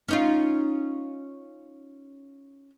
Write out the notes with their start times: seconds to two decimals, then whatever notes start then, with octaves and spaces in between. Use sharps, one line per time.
0.08 C#4 D#4 F4